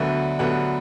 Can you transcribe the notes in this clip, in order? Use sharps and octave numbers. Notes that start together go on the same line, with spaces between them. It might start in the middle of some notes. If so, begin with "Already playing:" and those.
Already playing: D2 D3 F#3 B3 E5
D2 D3 F#3 B3 F#5